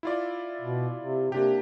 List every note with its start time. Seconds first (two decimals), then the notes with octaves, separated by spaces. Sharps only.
0.03 E4 F4 D5
0.61 B2
0.99 C3
1.32 C3 A#3 D4 G4